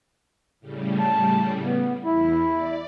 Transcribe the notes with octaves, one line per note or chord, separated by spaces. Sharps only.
A2 C#3 G3
A5
B3
E2 E4
D5